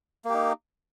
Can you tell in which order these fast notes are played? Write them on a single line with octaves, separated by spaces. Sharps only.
A#3 G4 D#4